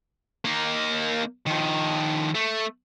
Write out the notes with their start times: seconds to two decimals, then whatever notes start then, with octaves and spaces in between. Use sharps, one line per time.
0.45 A#3 D#4
1.47 D#3 F3
2.35 A3